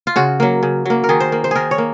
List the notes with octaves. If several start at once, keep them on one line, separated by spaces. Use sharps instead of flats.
F4
C#3 F#4
F#3 A#3
C#3
F#3 A#3
A#4
D#3 G#4
C5
A#3
C5
D#3 G#4 A#4
C#5
A#3